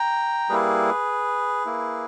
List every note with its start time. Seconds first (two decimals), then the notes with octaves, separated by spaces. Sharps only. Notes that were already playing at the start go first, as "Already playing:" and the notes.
Already playing: G5 A#5
0.49 G3 A#3 E4 G#4 B4
1.65 A#3 E4